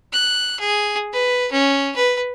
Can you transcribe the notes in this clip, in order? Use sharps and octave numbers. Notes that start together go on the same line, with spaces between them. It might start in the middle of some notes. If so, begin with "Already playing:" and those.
F#6
G#4
B4
C#4
B4